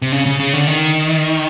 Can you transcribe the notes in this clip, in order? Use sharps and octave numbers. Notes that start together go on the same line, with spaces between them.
C3
C#3
C#3
C#3
D3
D#3